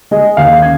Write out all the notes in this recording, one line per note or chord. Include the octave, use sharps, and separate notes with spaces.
G#3 D#5
D#2 F5
C#3 G#6